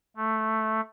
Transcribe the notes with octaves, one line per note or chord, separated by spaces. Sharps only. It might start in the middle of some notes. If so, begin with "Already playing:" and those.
A3